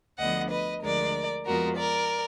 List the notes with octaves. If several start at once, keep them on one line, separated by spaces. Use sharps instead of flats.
D2 D3 F3 B3 D#5 F#5
B4 D#5
D2 D3 F3 G#3 A#4 D5
F2 F3 G#3 B3 F4 F#4 A#4
A#4 D5